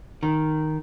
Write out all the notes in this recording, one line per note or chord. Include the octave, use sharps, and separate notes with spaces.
D#3